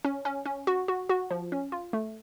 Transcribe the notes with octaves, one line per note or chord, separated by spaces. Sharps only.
C#4
C#4
C#4
F#4
F#4
F#4
F3
C#4
F4
A3